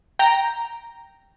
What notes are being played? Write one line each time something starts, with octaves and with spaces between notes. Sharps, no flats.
G5 A#5